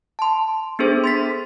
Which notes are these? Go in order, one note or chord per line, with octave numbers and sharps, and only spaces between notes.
A5 C6
B3 D4 G#4 A4 C5
C6 A6 B6